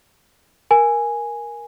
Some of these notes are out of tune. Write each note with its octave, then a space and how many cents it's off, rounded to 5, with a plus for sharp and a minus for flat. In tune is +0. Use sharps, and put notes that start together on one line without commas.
A#4 +10 G#5 +0